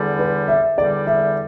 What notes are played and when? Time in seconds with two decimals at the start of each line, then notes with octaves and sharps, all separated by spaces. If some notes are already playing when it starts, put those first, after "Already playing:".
Already playing: E2 D3 G3
0.19 B4
0.48 E5
0.77 E2 D3 G3 D5
1.07 E5